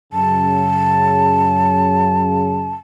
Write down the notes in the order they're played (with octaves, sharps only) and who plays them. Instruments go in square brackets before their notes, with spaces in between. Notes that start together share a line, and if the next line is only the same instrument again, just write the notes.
[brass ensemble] F#2 C#3 [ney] A5